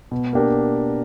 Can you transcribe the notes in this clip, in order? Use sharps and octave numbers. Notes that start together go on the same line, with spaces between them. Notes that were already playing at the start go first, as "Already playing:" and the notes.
B2
A#3 D4 G4 A#4